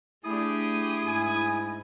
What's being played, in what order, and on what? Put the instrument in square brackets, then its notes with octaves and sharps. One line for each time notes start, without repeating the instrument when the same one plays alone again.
[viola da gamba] A3 D4 [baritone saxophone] E4 [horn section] G4 G#4 [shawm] D#6
[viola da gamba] G#2 [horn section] G#5